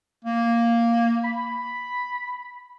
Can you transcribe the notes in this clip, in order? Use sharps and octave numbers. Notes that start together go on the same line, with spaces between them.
A#3
B5